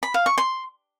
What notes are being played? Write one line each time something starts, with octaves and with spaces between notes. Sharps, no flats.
B5
F5
C#6
C6